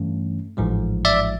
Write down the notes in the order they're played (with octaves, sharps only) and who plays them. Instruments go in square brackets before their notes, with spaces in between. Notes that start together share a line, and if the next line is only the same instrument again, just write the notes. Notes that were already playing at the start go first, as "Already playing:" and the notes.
Already playing: [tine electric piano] G2 E3 A3 C#4
A1 G#2 F3 G#3
D5 E5